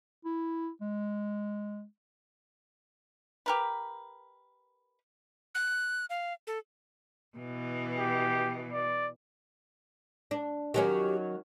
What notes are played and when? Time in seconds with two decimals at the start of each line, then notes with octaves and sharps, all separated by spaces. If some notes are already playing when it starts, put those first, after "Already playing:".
0.25 E4
0.81 G#3
3.46 G4 A#4 B4
5.55 F#6
6.10 F5
6.47 A4
7.38 B2 E3
7.98 G4
8.72 D5
10.31 D4
10.74 D#3 F#3 C#4 G4